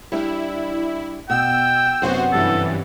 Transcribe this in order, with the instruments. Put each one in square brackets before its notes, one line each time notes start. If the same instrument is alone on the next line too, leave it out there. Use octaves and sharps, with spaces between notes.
[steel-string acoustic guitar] G3 D4 [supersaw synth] E4
[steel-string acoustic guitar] B2 [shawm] G5 [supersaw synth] E6
[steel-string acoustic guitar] F#2 C3 B3 [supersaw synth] F#4 C5
[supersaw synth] G2 E3 [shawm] A4